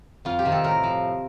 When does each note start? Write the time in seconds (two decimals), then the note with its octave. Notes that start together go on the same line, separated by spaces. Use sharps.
0.25 F2 F4
0.39 G4
0.45 C3 D#3
0.52 A4
0.64 A2 A#4
0.83 F3